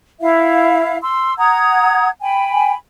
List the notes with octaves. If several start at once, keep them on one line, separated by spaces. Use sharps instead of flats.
E4 E5 F5
C6 E6
F#5 A#5 D#6 G#6
G5 G#5 B5